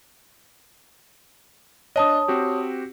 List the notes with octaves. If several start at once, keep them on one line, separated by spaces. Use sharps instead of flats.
D4 C#5 D#5 A5 D#6
C4 F#4 G4